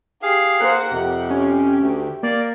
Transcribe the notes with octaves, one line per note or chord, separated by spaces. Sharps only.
G4 G#4 F5
A#3 C5 F#5
F2 C3 G4
C#4
D2
A#3 D5